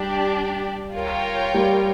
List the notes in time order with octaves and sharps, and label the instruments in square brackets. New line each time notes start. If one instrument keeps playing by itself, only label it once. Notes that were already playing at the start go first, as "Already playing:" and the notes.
Already playing: [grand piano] G3 [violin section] D4 G4 D5
[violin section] F4 A#4 C#5 G5
[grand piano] G3